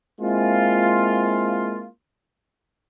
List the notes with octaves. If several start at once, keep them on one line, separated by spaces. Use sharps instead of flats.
G#3 A#3 C4 E4 F4